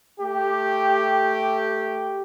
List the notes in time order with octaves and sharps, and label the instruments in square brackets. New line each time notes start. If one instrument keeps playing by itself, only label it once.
[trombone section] A3 G4